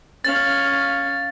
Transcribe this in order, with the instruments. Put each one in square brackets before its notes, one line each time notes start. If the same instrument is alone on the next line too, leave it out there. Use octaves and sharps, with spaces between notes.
[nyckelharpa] C#4 F5 [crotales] A6